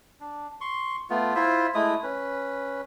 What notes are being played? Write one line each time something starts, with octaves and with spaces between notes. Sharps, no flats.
D4
C6 C#6
A3 B3 F4
E4 F4 C5 E5
G#3 A3 E4 D#6
C#4 B4